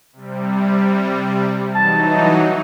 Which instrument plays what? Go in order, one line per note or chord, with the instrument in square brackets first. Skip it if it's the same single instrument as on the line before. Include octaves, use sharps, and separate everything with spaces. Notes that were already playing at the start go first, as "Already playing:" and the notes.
[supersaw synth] C3 G3
[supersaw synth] E3 F#3 D#4 [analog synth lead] A5